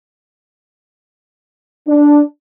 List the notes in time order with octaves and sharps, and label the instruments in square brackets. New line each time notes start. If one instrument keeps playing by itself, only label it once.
[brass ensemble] D4